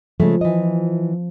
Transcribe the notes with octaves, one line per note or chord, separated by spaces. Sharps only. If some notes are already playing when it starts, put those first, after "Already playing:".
C#3 F3 G#3 A3
E3 D#5